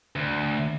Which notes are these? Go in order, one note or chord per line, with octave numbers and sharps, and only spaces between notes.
D2